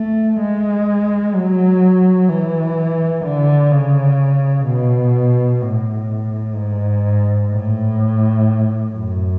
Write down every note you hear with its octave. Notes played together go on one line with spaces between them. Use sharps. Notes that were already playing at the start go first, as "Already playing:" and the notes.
Already playing: A3
G#3
F#3
E3
D3
C#3
B2
A2
G#2
A2
F#2